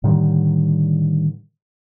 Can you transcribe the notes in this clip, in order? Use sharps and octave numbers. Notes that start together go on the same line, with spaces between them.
A2 D3 D#3 G3